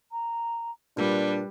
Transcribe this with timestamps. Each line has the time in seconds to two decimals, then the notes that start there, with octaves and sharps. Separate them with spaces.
0.11 A#5
0.97 A#2 G3 D4 B4